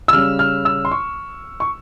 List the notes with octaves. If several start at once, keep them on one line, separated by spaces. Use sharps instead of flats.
E6
C#3 G3 C#4 F6
F6
E6
C6
C#6
C#6